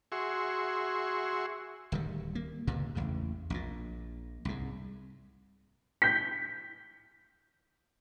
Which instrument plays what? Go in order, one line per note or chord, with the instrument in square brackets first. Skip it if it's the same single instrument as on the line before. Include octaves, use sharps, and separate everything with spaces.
[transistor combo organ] F#4 G#4 E5 C6 C#6
[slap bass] D1 D#3 G3
A#3
C#2 G2 A#2 D3
A1 E2 C#3
A#1 A#2
C2 G#2
[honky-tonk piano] G6 B6